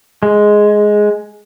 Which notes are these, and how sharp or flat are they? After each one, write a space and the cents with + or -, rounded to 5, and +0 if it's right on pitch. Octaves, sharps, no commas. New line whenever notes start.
G#3 +5